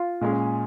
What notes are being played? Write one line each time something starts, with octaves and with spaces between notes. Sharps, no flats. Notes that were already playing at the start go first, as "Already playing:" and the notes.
Already playing: F4
A#2 G#3 C#4 G#4